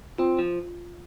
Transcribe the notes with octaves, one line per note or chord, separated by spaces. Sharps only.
C4 F4
F3